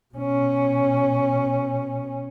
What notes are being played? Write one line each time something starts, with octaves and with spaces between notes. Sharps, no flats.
B2 C#4